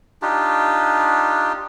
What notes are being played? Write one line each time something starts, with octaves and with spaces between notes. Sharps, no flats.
D4 D#4 F4 G4